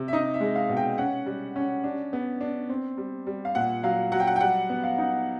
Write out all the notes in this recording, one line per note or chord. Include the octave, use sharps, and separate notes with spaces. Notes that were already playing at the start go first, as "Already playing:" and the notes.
Already playing: C3
E5
D#4 D#5
E5
G#3
F5
B2
G5
C#4 F#5
G3
C#4
D4
B3
D4
C4
G3
G3
F5
A#2 F#5
F#3 F5
F#3 F#5
G5
F#5
G5
G3 F#5
B3
F5
D#4